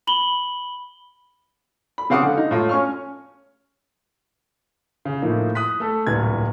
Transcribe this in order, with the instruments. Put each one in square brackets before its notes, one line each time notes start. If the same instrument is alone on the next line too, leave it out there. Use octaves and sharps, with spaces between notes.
[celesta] B5 F#7 G7
[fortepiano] B5
C#3 C4 F5 F#5 D6 D#6
D3
D#4
A2 F4
C#4 C#6 F6
[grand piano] C#3
A2 F3 A#3 D#4 E4
D#6 F#6 B6
A3 A4
D1 G1 C2 A#2 B4 G#6